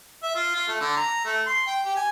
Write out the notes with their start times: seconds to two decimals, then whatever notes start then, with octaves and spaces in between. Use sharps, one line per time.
0.23 E5
0.35 F4
0.55 F4
0.68 A3
0.81 D3
0.96 A#5
1.25 A3
1.47 C6
1.67 G5
1.85 G4
1.96 G#5